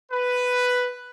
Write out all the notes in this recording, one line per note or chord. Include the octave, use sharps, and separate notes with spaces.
B4